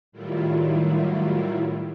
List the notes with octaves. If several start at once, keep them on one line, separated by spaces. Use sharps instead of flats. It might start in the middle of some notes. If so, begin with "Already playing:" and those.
A2 D#3 F#3 G3 E4 F4